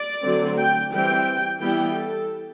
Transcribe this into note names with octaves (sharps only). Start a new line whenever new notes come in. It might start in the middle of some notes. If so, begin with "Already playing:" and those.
Already playing: D5
D3 F#3 A3 C4
G5
E3 G3 C4 G5
E3 G3 B3 E4 G5
A4